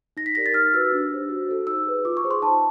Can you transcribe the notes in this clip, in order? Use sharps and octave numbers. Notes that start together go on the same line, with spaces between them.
D#4 A#6
B6
G4 A#4 D5 A#6
A6
D#4 F6
F#4 B4 E6
D4
G4 C5
F#4
A4 C5
D#4 E6
G#4 B4
F4 D6
C#6
G#4 C5
C6
D#4 A5